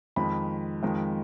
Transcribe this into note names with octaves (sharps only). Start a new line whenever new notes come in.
F2 D#3 G#3 B5
F2 D#3 G#3